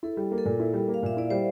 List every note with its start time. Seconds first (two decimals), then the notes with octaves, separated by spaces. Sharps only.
0.03 E4 A4
0.17 G3
0.31 A#3
0.38 A4
0.45 A#2 A#4
0.59 E4
0.73 G3
0.88 A#3
0.94 F5
1.03 A#2 E5
1.17 E4 D5
1.30 G3 C5